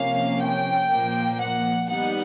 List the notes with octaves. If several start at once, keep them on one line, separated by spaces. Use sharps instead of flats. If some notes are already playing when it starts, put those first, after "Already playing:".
Already playing: C3 F3 A#3 C#4 F5
G5
A#2 F3 A#3
F#5
D#3 G3 B3 D#4 F#5